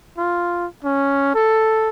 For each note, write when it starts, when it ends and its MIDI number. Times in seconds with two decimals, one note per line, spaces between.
0.18 0.67 65
0.85 1.33 61
1.35 1.89 69